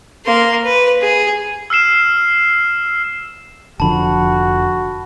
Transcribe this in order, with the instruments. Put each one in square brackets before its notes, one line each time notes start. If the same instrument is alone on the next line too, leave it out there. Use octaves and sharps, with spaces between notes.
[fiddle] A#3 C6
B4
G#4
[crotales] E6 F6 C7 E7
[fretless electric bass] F1 D3 F3 [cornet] F#4 [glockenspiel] A5 B5